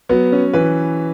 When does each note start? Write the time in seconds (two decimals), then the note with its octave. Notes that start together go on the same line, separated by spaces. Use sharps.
0.09 F#3 B3
0.32 C#4
0.53 E3 B4